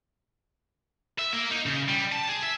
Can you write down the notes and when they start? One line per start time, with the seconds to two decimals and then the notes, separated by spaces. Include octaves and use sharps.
1.19 E5
1.33 A#3
1.51 D#4
1.66 C#3
1.88 G3
2.12 A5
2.29 G#4
2.43 E5